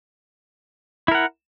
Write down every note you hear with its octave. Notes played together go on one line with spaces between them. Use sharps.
E4 A#4 F#5